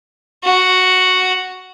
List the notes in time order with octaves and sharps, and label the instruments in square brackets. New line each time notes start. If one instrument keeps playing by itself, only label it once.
[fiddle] F#4